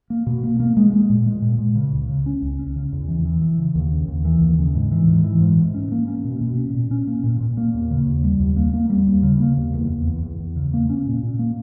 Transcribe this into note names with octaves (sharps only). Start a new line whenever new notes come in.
A#3
B2
A#3
A#3
G#3
G#3
A#2
G#3
A#2
A#2
C#3
C#2
C#3
C#4
C#2
C#4
C#3
E2
E3
E3
E3
C#3
D#2
C#3
D#2
E3
D#2
C#3
G#2
E3
G#2
E3
G#2
G#2
C#4
A#3
C#4
B2
B2
C#4
A#2
C#4
A#3
A#2
A#2
A#3
D#2
C#3
D#2
G3
D#2
A#3
A#3
G3
D#2
C#3
A#3
D#2
E2
E2
E2
E2
E2
C#3
A#3
C#4
A#2
A#2
A#3